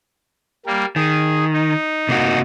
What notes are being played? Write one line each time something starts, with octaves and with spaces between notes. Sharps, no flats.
G3 A#3
D#3 G#4
D#4
C3 A#3 F#4